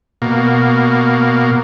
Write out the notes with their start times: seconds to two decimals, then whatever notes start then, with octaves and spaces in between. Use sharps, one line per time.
0.22 B2 A#3